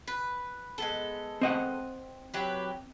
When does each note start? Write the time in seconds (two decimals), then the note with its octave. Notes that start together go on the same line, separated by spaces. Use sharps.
0.07 B4
0.78 G#3 B3 A4
1.41 C4 D#5 F#5
2.34 F#3 G4 B4